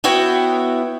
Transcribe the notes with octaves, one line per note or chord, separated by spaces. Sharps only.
B3 E4 F#4 C#5 G5